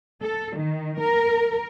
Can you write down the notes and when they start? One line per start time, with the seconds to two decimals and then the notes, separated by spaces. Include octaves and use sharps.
0.22 A4
0.56 D#3
0.99 A#4